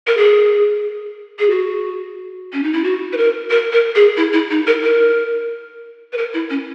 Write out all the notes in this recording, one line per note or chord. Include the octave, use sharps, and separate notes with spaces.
A#4
G#4
G#4
F#4
C#4
D#4
E4
F#4
B4
A#4
A#4
A#4
G#4
E4
E4
D#4
A#4
A#4
B4
A#4
E4
C#4